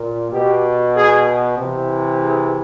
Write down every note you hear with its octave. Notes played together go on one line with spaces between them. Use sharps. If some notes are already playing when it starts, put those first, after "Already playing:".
Already playing: A#2
B2 G4
G#4
C3 E3
G#4